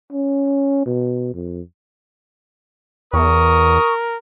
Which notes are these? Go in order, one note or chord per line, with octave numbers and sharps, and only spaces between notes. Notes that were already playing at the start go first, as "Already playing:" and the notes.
C#4
B2
F2
E2 A#4 C#6 D#6